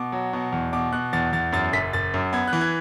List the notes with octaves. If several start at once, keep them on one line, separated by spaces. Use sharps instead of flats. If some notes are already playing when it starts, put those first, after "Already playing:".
Already playing: B2 D6
F#3
B2
E2
B2 D6
B2 F#6
E2 A6
E2 A6
F#2 A6
F#1 B6
F#1 A6
F#2
B3 G#6
F#6
E3
G#6